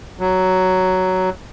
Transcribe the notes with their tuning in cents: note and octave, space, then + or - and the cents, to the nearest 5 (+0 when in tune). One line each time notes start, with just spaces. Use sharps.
F#3 +10